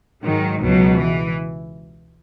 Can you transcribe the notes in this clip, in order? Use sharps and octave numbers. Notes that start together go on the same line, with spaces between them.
G#2 D#3 F#3
C#2 B2 F#3
E3